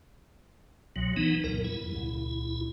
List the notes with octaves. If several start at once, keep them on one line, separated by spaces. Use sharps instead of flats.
C2 B2 F#3
E3 B3 D#4
D#1 C#2 F#2 A#4
F2 G#2 G3 E4
D#1 C#2 C#3